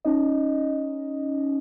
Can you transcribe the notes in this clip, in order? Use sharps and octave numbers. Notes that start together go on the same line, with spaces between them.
C#4 D#4 D#5